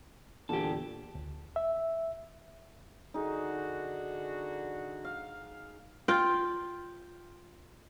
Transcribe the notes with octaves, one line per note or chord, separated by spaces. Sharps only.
E2 A#2 D3 G4 A4
D2
E5
D3 D#4 F#4 G#4
F5
F4 G5